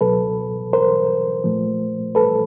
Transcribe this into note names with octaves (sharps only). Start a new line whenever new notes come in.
C#2 B2 F#3 A4 B4
A#4 C5
A#2 F3 A3
A4 B4